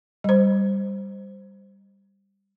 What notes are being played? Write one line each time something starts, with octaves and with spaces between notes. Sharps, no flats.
G3 C5